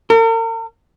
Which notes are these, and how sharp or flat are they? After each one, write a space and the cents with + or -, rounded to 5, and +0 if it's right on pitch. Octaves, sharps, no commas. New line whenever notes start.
A#4 -45